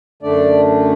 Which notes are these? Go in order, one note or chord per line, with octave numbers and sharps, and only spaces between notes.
F#2 D3 A3 D4 D5